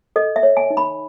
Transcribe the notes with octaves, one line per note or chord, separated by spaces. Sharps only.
A4 D#5
E5
C#5
G#5
D#4
B5